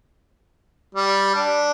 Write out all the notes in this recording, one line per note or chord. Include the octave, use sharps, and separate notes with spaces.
G3
D4